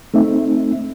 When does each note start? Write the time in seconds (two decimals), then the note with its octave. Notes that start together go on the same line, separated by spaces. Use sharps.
0.14 A3 C4 D#4 E5